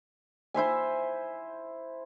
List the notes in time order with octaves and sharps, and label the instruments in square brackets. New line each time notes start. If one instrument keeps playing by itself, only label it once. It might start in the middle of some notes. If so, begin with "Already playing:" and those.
[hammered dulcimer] E4 C5 E5 G#5